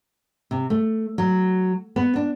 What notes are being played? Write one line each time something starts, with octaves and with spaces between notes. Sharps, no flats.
C3
A3
F#3
B3
D4